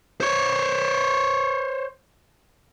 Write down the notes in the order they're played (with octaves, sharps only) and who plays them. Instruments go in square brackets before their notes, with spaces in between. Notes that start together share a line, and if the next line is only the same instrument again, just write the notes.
[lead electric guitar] C5 C#5